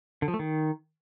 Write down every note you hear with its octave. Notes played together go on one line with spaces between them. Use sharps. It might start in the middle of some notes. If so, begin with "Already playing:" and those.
D3
F3
A3
D#3